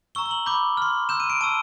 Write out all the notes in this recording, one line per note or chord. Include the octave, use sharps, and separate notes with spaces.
A#5 C#6 E6 G7
G7
F#7
B5 D6 G6
C6 F6
C6 E6 G6 E7
D#7
D7
A5 C#6 E6 D#7